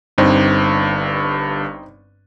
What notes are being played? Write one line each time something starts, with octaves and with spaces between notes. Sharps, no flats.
G1 G2 C4 D#4